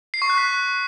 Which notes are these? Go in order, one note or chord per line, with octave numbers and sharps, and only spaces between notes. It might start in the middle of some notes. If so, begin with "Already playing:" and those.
C7
C#6
F#6
B6